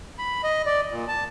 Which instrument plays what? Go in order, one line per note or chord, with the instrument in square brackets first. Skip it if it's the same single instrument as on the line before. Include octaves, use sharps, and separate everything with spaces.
[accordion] B5
D#5
D5
A#2
A5